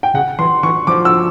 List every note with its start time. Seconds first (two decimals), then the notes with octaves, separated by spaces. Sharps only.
0.03 G5
0.14 C#3 F#5
0.39 E3 C6
0.63 E3 C#6
0.87 F3 D6
1.05 E6